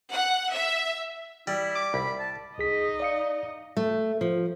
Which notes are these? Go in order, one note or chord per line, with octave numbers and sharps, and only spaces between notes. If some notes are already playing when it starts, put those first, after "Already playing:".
F#5
E5
G3 E4
D6
C2 B5
A5
C2 D#4 G#4 D#5 B6
D5 F5 C#7
A3
F3